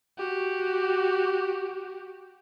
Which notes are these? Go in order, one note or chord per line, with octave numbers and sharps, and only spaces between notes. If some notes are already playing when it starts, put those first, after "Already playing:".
F#4 G4